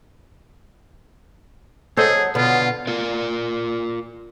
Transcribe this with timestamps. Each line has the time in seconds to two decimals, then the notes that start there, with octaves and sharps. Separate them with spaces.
1.97 F#3 G#4 A4 C5 D#5
2.35 B2 D3 B3 F4
2.87 F4 A#4 D5